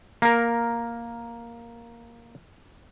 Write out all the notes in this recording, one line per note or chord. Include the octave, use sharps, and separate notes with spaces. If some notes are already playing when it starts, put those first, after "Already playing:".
A#3 A#4